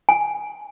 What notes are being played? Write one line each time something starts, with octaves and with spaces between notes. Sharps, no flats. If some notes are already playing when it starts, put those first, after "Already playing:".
G#5